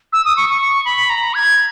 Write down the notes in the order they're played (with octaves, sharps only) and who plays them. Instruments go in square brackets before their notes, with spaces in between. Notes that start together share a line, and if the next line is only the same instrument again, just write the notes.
[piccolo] E6
D#6
C#6
C#6
C#6
B5
A#5
G#6